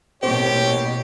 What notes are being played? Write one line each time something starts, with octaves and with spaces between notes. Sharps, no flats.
A1 B2 A#3 C4 G4 C#5